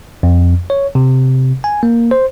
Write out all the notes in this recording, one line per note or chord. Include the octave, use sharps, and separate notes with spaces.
F2
C#5
C3
G#5
A#3
C5